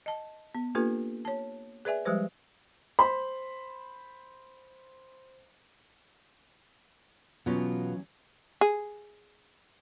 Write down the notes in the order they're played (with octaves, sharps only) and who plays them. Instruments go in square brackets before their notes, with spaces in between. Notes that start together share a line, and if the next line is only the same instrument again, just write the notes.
[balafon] D#5 A5
B3
A#3 D4 F4 G4 A4 B4
C#5 A5
G#4 B4 D5 E5 G#5
F3 G3 G#3 G4 B4 C5
[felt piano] C5 B5 C6
[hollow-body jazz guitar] E2 F#3 C#4 [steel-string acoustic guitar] B2 F4
[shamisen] G#4